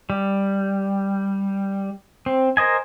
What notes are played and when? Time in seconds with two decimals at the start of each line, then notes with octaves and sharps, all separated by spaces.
0.10 G3
2.26 C4
2.57 A#4 C5 D#5 G#5